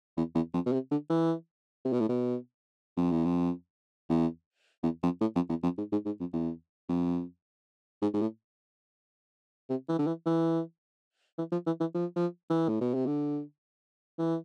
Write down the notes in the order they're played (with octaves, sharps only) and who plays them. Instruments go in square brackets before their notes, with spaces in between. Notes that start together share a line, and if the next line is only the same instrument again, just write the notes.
[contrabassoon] E2
E2
F2
B2
C3
D3
E3
C3
B2
A2
B2
F2
E2
F2
E2
E2
F2
A2
F2
E2
F2
G#2
G#2
G#2
F2
E2
F2
G#2
G#2
A2
C3
E3
D3
E3
E3
E3
F3
E3
E3
F3
F3
E3
A2
B2
C3
D3
E3